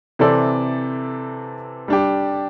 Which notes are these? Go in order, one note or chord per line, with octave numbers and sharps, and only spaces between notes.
C3 E3 C4 A4 D5
G3 D4 G4